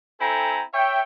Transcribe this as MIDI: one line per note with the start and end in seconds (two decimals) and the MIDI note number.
0.21 0.63 60
0.21 0.63 64
0.21 0.63 69
0.21 0.63 79
0.21 0.63 80
0.21 0.63 82
0.74 1.01 73
0.74 1.01 76
0.74 1.01 79